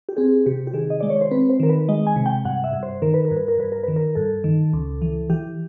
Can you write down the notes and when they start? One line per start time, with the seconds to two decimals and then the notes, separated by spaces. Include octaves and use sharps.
0.09 G4
0.17 C4 G#4
0.46 C3 G4
0.67 G4
0.74 D#3 G#4
0.90 D#5
1.01 G#3 D5
1.10 C#5
1.21 C5
1.31 C4 B4
1.50 C5
1.60 D#3 A#4
1.69 B4
1.89 G#3 D#5
2.07 G#5
2.16 C3
2.26 G5
2.45 G2 F#5
2.64 E5
2.73 G2
2.83 C5
3.02 D#3 A#4
3.14 B4
3.25 A#4
3.31 G2
3.37 B4
3.48 A#4
3.58 G2 B4
3.72 A#4
3.83 D#3 B4
3.96 A#4
4.15 G2 A4
4.44 D#3
4.73 C#2
5.02 E3
5.30 E3 G4